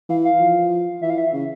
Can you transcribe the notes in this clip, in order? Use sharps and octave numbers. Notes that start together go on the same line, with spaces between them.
E3 F5
F5
F3
E3 E5
F5
E5
C#3